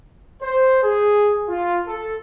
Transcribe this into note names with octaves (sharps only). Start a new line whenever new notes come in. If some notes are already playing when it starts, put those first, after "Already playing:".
C5
G#4
F4
A4